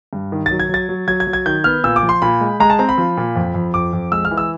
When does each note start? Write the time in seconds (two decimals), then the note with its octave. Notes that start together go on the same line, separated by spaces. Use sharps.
0.13 G2
0.32 D#3
0.46 F#3 A6
0.60 G#6
0.69 F#3 A6
0.89 F#3
1.08 F#3 G#6
1.20 G#6
1.27 F#3
1.33 G#6
1.46 D#3 G6
1.64 B3 F6
1.84 A#2 E6
1.96 D6
2.03 F3
2.09 C6
2.22 A#2 B5
2.41 G#3
2.60 G#3 A#5
2.70 A5
2.79 C4 A#5
2.89 B5
2.98 F3
3.17 A#2
3.36 F2
3.54 F2
3.74 F2 D6
3.93 F2
4.12 G#3 E6
4.25 F6
4.31 E3
4.38 E6